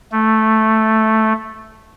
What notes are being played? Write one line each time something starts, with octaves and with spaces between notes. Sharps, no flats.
A3